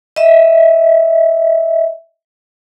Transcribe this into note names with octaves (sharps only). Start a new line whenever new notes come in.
D#5 E5